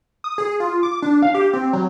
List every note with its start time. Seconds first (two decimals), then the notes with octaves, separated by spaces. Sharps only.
0.24 D#6
0.38 G#4
0.60 F4
0.83 D6
1.02 D4
1.22 F5
1.34 G4
1.53 C4
1.73 F#3